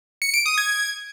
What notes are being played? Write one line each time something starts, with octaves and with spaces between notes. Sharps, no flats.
C#7
D7
D#6
G#6